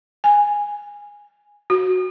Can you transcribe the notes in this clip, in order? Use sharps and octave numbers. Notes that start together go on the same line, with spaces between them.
G#5
F#4